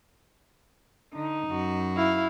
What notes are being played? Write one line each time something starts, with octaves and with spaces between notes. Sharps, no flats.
D3 D#4
F#2 F#4
E4 F5